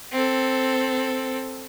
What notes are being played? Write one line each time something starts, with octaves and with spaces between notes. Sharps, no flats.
C4 A4